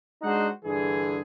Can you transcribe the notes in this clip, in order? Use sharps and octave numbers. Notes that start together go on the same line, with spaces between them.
G#3 D4 D#4 F#4 C5 F#5
G2 D3 E3 G#4